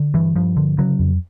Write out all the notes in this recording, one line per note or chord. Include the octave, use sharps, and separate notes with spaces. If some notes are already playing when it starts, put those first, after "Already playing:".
Already playing: D3
G2 E3
G2 F3
D3
C#3 F#3
F2